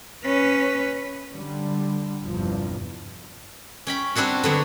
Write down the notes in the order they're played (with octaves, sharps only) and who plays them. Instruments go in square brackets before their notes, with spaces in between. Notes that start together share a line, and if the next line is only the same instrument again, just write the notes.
[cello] C#4 B4
[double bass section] D3 G3
G1 E2 G2 C3 F3
[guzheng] C#4 G5 B5
G3 C4 D4 E4 F#4
D3 F#3 B3